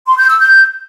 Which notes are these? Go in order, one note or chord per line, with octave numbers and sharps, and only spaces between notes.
C6
G6
E6
G6